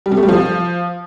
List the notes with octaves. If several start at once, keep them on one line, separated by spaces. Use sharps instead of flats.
G3
C3
A3
G3
F3